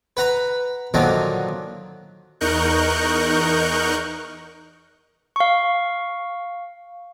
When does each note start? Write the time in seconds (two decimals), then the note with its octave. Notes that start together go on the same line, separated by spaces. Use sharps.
0.17 B4 F#5 A#5 B5
0.94 A#2 D3 D#3 F3 F#3 A#3
2.41 E2 D#4 A#4 C#6 F#6 G6
5.36 F5 C#6